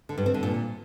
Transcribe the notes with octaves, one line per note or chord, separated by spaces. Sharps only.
D3
G2
C4
D3
A#2